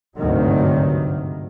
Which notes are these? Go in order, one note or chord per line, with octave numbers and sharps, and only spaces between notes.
G#1 D2 G2 C3 D#3 F#3